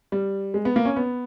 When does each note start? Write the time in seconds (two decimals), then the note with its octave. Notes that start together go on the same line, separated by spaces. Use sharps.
0.12 G3
0.54 G#3
0.65 B3
0.76 A#3
0.85 C#4
0.96 B3